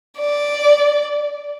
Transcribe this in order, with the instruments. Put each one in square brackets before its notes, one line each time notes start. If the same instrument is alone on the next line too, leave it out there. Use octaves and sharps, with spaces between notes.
[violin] D5